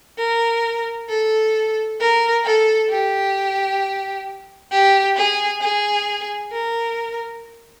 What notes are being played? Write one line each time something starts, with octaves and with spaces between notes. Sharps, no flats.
A#4
A4
A#4
A4
G4
G4
G#4
G#4
A#4